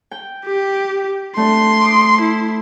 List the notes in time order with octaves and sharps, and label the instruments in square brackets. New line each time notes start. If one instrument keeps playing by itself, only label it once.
[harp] G5
[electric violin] G4
[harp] A3 C4 D4 [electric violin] C6
[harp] D6 D#6
[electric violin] E4